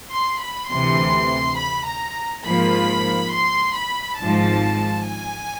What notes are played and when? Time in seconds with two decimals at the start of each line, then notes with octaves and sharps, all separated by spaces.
0.14 C6
0.43 B5
0.72 D2 C3 E3 C6
1.59 B5
1.88 A#5
2.45 G#2 F3 A#3 B5
3.33 C6
3.76 B5
4.19 G#1 G#2 F3 A5
5.06 G#5